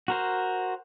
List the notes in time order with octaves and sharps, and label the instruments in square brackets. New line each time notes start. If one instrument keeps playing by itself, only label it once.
[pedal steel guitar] F#4 A#4 C5